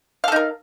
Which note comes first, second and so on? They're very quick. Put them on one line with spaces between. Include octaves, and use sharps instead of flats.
F5 A4 D#4 A#4